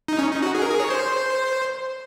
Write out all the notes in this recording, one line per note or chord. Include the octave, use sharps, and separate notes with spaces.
D#4
C#4
D#4
F#4
G#4
A#4
G#4
C#5
C5